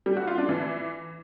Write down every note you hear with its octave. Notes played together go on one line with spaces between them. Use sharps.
G3
F#4
F4
D4
E3